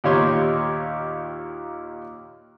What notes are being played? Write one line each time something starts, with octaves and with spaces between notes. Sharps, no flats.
D#2 A#2 D#4 G4 C#5 C6